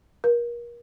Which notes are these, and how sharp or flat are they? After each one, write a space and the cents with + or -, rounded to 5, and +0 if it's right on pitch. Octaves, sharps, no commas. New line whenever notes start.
A#4 +30